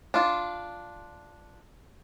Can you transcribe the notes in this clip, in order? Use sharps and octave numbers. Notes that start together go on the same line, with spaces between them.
D4 F4